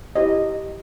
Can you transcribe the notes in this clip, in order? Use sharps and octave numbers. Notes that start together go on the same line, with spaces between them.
E4 G4 C5 D#5